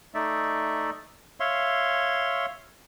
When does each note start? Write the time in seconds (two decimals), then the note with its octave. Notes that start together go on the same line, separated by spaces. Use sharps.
0.15 A3 D#4 D5 E5
1.40 C#5 E5 F5 C6